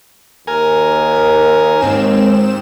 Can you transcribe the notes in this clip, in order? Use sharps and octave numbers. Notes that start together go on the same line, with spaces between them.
D#2 A#4 G#5
G#2 C4 E7